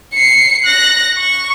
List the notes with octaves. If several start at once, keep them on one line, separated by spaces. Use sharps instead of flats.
C7 C#7
F#6 A#6
C#6